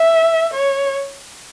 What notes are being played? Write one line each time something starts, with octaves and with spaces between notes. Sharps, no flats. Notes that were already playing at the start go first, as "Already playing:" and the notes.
Already playing: E5
C#5